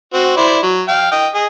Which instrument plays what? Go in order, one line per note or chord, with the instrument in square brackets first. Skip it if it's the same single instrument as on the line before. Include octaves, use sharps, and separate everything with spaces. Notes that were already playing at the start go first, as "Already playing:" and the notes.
[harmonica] C4 F#4
E4 C5 D5
F#3
F5 G5
D#5 G5
G#4 D#5